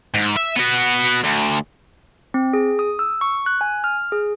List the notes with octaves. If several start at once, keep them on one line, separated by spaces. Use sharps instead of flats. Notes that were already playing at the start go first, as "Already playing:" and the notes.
G#2
E5
B3 F#4
D2
C4
G#4
D#6
E6
C#6
F#6
G#5
F6
G#4